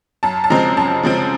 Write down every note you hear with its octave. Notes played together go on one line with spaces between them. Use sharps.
F#2 A5
A5
C#3 F3 G#3 C4 A#5
F#2 A5
C#3 F3 G#3 C4